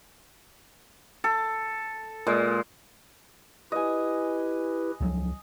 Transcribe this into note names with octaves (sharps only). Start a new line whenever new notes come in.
A4
A#2 G#3
E4 G4 B4 D#5 G#5
C#2 F3 F#3